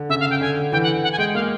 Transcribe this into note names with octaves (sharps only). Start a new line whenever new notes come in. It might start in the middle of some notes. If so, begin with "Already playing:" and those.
Already playing: D3
C#3 E5
F5
G5
D3 G#5
D3
E3 G5
F#5
F#5
G#5
G#3 G5
A#3 F5